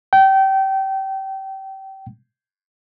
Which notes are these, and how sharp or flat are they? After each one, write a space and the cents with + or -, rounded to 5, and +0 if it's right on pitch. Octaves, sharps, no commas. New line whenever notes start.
G5 -25